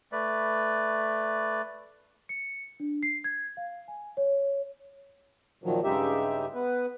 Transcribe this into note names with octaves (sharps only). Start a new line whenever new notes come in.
A3 B4 D5
C#7
D4
C7
G#6
F5
G#5
C#5
A#2 D#3 F3 F#3
G2 C#3 G#3 D#4 G4 E5
B3 B4